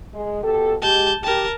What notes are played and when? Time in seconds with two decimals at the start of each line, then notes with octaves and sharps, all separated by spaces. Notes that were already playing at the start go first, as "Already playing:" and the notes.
0.14 G#3
0.43 B2 G4 A4
0.82 G#3 G4 A5 G6
1.23 G4 A#4 A5